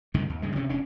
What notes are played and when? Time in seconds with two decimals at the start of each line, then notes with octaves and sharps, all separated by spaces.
0.14 C#2 G2 C3 D#3
0.30 D#2
0.42 G2 C#3 G#3
0.56 C3 C#4
0.69 E1 C#4 D4